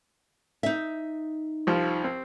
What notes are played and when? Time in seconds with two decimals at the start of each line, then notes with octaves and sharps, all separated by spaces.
0.63 D#4 E5
1.67 C2 F3
2.04 C4